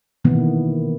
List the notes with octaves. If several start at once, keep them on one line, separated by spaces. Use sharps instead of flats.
B2 D#3 E3 A#3 B3